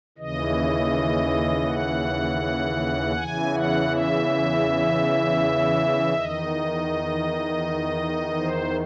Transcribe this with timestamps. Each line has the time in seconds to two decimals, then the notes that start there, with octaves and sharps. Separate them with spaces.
0.18 D#2 C#3 E3 D#5
1.67 F#5
3.16 E2 C#3 E3 G#5
3.53 F#5
3.90 E5
6.14 E2 D#3 D#5
8.37 C5